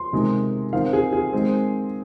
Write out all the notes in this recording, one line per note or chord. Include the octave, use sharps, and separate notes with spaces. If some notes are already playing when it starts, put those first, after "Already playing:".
Already playing: C6
C3 D#3 G#3
D#3 C4 F5
G#4
G#4
D#3 G#3 C4